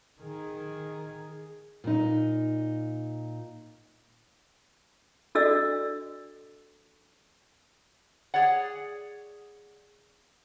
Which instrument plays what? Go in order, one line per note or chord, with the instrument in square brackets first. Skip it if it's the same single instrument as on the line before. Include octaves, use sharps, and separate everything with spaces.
[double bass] D#3 [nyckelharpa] G#4
[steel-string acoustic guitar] A#2 D#4
[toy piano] D4 F#4 A4 D5 D#5 E6
[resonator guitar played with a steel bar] G#4 C#5 D5 F#5